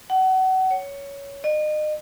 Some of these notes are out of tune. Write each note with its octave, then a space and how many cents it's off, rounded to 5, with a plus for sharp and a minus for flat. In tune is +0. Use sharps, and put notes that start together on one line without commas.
F#5 +30
C#5 +10
D#5 -35